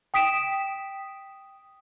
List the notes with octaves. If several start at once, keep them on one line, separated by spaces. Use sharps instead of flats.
G5 D#6 B6 D7 E7